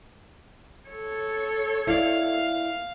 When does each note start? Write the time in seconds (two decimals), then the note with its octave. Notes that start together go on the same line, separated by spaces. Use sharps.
0.89 A4 C#5
1.87 E4 D5 F5